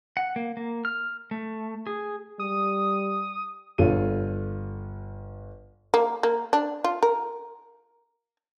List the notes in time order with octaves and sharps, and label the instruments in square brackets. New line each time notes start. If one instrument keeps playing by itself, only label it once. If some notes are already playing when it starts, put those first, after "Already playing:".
[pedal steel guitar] F#5
A#3
A#3
F6
A3
G#4
[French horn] G3 [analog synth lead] D#6
[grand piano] G1 F4 A4 C#5 D#7
[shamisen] A#3
A#3
D4
F4
A#4